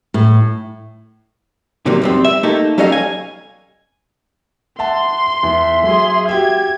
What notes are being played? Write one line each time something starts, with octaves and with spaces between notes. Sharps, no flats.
A2
C3 D#3 F#3 G3 A#3
F#2 G3 C4
E5
A3 A#3 D#4 G4 A4
F#3 G3 C#4 A4 D#5 F5
G#5
E5 F#5 A5 C6
E2 E5
F#3 G#4 A4 C6
F#4 G4 E5 G#6